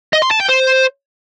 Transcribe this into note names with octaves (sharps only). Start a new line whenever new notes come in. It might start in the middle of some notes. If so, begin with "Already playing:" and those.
D#5
C6
A5
G5
C5